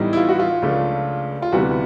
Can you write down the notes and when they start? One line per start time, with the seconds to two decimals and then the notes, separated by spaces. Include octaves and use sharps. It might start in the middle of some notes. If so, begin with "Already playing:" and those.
Already playing: A2 E3 G3 B3 D#4
0.13 E4
0.17 F4
0.29 F#4
0.39 F4
0.62 C#2 C#3 F3 A3 D4
1.42 F4
1.52 D2 C3 E3 G3 B3 F#4